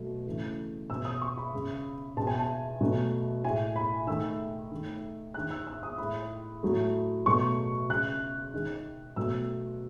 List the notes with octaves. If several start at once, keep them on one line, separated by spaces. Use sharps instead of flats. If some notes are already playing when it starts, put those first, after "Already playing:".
Already playing: B2 F#3 A3
C#3 E3 A3
B2 G#3 E6
D#6
C#6
B5
C#3 G#3
B2 G#3 A5
G#5
A5
B2 F#3 A3
A2 G#3 G#5
B5
D#3 A3 E6
D#3 A3
D#3 G#3 F#6
E6
E6
D#6
A2 G#3 B5
A2 F#3 A3
B2 F#3 A3 C#6
C#3 G#3 F#6
D#3 G#3
B2 F#3 A3 E6